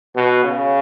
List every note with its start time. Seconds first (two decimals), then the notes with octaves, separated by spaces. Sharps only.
0.16 B2
0.44 C#3